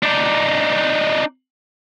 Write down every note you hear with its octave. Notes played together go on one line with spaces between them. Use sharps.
D4 D#4